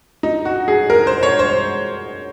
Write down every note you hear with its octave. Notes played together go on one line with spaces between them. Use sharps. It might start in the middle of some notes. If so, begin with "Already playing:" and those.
D#4
F#4
G#4
A#4
C5
C#5
C5